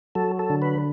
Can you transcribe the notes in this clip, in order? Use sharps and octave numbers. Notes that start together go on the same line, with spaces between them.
F#3 A4
A4
D3
B4